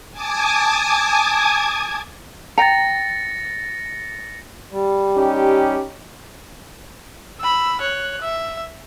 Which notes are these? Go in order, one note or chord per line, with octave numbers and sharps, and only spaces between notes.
G#5 A5 D6 D#6 G#6
G5 A#5 A6 A#6 C#7
G3
C#4 D#4 G4
B5 E6
C#5 F#6
E5